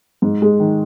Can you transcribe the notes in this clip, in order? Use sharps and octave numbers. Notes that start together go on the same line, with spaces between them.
G#2
G#3
D#3